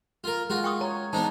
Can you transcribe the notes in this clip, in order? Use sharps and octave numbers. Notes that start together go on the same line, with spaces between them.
F4 A#4
G#3 F4 F#4 G#4 A#4
G5 C#6 D#6
C#5 A#5
E3 G#3 B3 D4 D#4 C5 A5